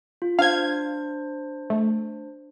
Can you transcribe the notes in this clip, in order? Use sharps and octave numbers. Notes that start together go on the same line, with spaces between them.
F4
D4 C5 F5 G#6
A3